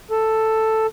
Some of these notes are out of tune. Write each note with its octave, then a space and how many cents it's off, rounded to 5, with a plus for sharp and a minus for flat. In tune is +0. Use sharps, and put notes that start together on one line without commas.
A4 +5